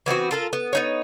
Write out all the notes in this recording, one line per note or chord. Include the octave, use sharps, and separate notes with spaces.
E3 B3 C4 F#4
F4 A4 A#4
B3
B3 D#4 C#5